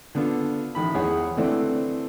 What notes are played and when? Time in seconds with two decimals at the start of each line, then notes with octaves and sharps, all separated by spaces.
0.15 D3 B3 F4 A4
0.75 A1 D#3 B5
0.94 E2 G#4 C#5 F#5
1.37 D3 E3 A3 C4 D4 A4